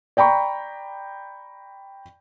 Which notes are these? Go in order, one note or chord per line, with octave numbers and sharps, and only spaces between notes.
D5 G5 A#5 B5 C#6